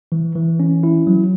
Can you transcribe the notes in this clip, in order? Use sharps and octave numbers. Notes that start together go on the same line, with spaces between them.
E3
E3
C#4
E4
F#3